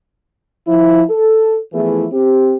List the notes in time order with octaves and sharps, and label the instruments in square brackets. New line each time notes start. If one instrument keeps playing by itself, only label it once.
[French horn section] F3 E4
A4
E3 F3 A3 B3 E4 G#4
C4 G4